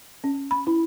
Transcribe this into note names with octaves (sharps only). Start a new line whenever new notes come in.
C#4
B5
E4